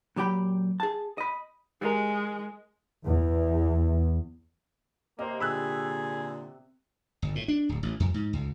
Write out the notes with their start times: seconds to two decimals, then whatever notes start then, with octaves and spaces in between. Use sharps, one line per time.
0.16 A#2 F#3 G4 G5 B5
0.80 G#4 A5
1.18 D#5 B5
1.81 G#3 G4 A#4
3.04 E2
5.19 C3 A#3 C5 D#5
5.40 A#2 D3 G#4 B5 E6 F#6
7.22 G1
7.35 A2
7.48 D4
7.69 D1
7.83 A1
8.00 F2
8.14 G#2
8.33 C#2